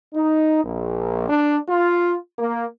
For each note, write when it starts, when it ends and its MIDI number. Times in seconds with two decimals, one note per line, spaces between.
0.14 0.64 63
0.65 1.29 34
1.29 1.57 62
1.69 2.15 65
2.39 2.66 58